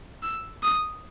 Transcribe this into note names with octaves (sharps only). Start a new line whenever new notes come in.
E6
D#6